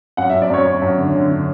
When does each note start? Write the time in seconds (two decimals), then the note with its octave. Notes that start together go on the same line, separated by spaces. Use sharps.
0.17 F#2 F#5
0.30 E5
0.34 F#2
0.42 D5
0.50 F#2 C#5
0.66 F#2 C#5
0.82 F#2
0.98 D3
1.14 D3
1.31 D3